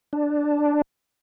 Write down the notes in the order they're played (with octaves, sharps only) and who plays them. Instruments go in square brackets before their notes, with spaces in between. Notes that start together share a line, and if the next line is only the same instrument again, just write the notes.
[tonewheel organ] D4